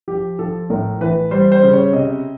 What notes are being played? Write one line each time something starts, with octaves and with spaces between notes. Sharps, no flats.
F3 G4
F3 A4
A2 A#4
E3 B4
G3 C5
C5
C#3
C#5
C3 D#5